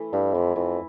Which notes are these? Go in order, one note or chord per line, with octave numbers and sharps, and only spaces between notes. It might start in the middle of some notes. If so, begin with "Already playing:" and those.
Already playing: E3 A3
G2 E4
F2 E3
F2 E3